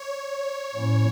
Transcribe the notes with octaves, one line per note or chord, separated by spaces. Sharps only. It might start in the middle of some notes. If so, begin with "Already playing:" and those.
Already playing: C#5
A2 F3 A#3 C#4 E4